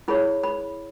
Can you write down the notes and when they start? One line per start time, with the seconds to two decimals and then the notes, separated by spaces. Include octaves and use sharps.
0.08 E4 G#4 C#5 B5
0.43 B5